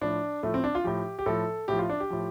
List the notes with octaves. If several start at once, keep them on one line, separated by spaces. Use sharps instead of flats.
A2 F3 D4
A2 F3 A3
C4
D4
F4
A2 F3 G4
G4
A2 F3 A4
A2 F3 G4
F4
D4
G4
A2 F3